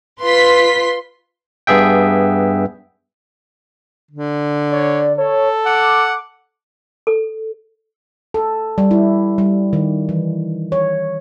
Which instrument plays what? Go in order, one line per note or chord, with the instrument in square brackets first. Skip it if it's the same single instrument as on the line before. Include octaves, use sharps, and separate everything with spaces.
[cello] F4 B4 [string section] C6 B6
[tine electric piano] G2 B3 G#4 E5 G5
[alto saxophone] D3
[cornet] C#5 [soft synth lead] D5
[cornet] A4 [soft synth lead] C#5
[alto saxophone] F#5 [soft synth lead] D6
[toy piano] A4
[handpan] A4
G3
E4
G3
D#3
E3
C#5